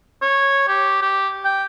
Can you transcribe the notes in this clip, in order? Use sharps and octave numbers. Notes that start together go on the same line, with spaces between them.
C#5
G4
G4
G5